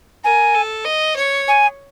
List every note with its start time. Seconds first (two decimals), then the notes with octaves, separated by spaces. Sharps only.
0.24 A#4 G#5
0.55 A4
0.85 D#5
1.16 C#5
1.48 G#5